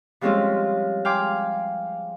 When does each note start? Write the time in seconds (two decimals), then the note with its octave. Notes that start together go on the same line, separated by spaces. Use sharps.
0.21 F3 G3 G#3 C4 C#4 F4
1.05 F5 G5 G#5 C6 D6